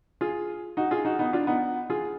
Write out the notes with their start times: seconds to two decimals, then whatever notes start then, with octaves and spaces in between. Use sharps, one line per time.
0.21 F4 G#4
0.77 D#4 F#4
0.91 F4 G#4
1.05 D#4 F#4
1.19 B3 D#4
1.33 D4 F4
1.47 B3 D#4
1.90 F4 G#4